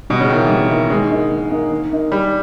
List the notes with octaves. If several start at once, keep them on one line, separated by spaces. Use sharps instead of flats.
B2 G3
C#3
D#3 A#3 E4
E3
G3
A#3 E4
D#3 G#3
A#3 D#4
D#3
A#3 D#4
D#3
A#3 D#4
D#3 G3